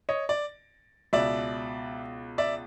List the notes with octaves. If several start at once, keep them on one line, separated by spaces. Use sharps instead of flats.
C#5 D#5
D5
C#2 B2 D5 E5
D5 E5